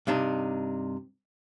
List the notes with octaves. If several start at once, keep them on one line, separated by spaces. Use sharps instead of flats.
G2 C3 D4 D#4